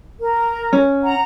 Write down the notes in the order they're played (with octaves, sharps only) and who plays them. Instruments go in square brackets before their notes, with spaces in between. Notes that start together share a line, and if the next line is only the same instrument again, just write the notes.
[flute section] A#4
[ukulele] C#4
[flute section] F#5 A#5